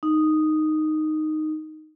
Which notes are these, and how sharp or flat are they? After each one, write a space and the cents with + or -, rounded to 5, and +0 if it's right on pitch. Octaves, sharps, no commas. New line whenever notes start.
D#4 -5